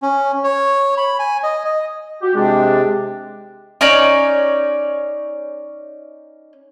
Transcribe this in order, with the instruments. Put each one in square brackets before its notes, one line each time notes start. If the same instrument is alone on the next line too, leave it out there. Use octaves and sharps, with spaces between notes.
[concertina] C#4
C#5
B5
G#5
D#5
D#5
[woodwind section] F#4 G4
[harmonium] C3 C4 G4 [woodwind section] G#3 D4
[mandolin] C#4 D#4 C#5 D5